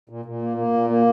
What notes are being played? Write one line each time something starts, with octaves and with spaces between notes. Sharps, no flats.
A#2
A#2
A#3
A#3
A#2
A#3